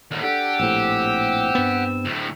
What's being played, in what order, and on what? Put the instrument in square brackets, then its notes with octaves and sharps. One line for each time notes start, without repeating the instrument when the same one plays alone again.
[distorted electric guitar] D#2 A2 [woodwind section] D3
[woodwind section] D4 A4 [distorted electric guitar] G4 [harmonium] F#5
[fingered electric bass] A#1 A2 [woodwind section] C4 E6
[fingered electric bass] G2 B3
[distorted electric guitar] D2 A2